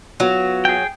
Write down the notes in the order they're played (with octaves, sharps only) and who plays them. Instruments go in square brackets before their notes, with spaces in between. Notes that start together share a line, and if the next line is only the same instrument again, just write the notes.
[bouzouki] F#3 [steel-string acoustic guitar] B3 F4 F#4
[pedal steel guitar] G#4 G5